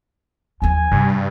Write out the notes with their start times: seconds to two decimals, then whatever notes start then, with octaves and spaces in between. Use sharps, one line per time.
0.62 D#2 F3 G#5
0.92 G2 C3